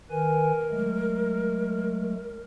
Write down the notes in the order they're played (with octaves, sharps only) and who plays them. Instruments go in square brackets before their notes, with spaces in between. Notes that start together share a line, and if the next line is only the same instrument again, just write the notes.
[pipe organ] D#3 B4 G#5 [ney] A#4
[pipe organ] F#3 G#3 A3